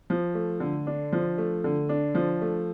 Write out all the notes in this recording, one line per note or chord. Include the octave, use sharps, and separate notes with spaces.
F3
A3
D3
D4
F3
A3
D3
D4
F3
A3